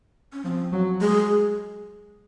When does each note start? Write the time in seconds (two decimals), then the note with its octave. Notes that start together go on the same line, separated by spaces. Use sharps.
0.33 C#4
0.44 F3 C4
0.72 F#3
1.01 G#3 G#4